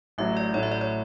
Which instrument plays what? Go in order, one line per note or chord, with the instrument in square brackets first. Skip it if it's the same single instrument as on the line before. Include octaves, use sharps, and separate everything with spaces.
[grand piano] A1 A2 F#3 [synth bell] E5
[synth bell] D5
[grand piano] A1 A2 F#3 [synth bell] C#5
[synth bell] E5
D5
C#5